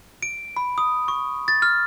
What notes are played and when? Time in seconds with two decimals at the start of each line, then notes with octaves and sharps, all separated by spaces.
0.23 D7
0.57 B5
0.78 D#6
1.08 C#6
1.48 A6
1.62 F6